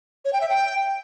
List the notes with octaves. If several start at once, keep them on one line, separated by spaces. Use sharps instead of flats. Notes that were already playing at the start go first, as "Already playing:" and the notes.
C#5
G5
E5
G5